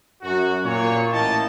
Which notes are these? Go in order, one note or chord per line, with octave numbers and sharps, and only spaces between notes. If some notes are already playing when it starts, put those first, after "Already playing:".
F#2 F#4
A#2 C#5
A1 A#3 E4 D#5 G5 A5